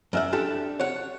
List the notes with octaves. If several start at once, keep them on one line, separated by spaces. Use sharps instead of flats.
F#2 E5 F#5
D4 G4 A4
C#5 F#5